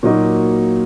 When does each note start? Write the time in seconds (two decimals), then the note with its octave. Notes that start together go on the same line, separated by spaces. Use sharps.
0.03 A#2 F#3 A#3 D#4 F#4